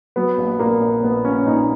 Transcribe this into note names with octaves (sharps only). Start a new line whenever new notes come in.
F#3 B3
A#1
A#2 A#3
A#1
A#1 B3
A#1 C#4
A#2 D#4